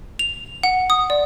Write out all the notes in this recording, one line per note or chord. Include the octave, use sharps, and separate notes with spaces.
F7
F#5
D#6
D5